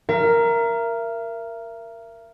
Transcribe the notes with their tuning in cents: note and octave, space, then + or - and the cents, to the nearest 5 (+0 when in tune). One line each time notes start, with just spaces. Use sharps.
A#4 +0 E5 +40